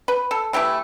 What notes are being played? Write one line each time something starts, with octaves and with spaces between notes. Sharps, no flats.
B4
A4
E3 A3 E4 G4